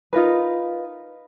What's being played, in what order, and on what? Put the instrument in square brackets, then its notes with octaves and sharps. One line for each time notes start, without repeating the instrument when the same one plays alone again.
[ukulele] D#4 F4 A#4 B4